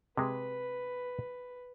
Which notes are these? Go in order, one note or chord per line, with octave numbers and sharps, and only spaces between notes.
C3 G#3 B4